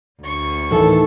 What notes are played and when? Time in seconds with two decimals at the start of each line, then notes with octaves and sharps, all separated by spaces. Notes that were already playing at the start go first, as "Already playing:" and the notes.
0.23 D2 C#6
0.71 A2 D#3 E3 A4